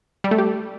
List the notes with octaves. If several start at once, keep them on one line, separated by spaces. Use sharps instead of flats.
G3
A3
G4